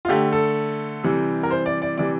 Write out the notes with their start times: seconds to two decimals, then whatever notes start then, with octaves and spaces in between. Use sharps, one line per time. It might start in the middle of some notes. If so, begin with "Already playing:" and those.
0.05 F4
0.08 D3 A3 G4
0.32 A4
1.04 C3 E3 G3
1.43 A#4
1.51 C5
1.66 D5
1.82 D5
1.97 C3 E3 G3 D5